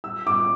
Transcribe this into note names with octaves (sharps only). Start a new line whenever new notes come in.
E6
D6